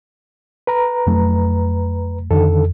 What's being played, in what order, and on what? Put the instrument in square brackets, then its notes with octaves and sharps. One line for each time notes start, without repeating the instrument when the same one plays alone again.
[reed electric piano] B4 A#5
[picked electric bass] F2 F#3 A3
[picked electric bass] F2 [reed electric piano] D3 D#3 A4